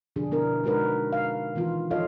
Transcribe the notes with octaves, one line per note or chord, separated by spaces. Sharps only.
B2 D3 F3 D4 G#4
B2 B3 D4 E4 A#4
G#3 D#4 F#4 A#4 B4
F5
D#3 E3 B3 F4
F3 F4 A4 C#5 D#5 F5